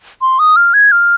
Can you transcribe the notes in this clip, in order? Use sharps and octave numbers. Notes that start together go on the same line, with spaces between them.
C6
D#6
F6
G#6
F6